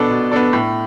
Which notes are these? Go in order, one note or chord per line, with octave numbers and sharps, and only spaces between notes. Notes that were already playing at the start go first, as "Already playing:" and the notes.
Already playing: B2 B3 D4 A4 D5
B2
B3 D4 A4 D5
A2